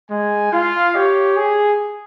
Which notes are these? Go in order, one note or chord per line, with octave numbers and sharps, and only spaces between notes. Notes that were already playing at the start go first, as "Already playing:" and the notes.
G#3 G#5
F4 F5
G4 C#5
G#4